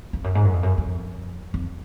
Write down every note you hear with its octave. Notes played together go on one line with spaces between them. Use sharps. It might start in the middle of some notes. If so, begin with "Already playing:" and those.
F2
F#2
G#2
F#2
F2
F#2
F2
F2